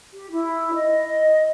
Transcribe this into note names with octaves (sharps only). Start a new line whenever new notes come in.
G4
E4
D#5